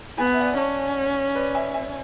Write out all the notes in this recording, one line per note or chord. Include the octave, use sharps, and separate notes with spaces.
B3 G#5
F#5
E5
D5 F#5
C#4 A5 C#6
B4 D5
E5 G#5
E5 G#5